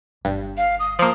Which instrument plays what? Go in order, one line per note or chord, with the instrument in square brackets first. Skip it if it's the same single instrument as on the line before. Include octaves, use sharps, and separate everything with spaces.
[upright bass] G1 [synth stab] G2
[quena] F5
D#6
[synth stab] F3 A#3 [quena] D#6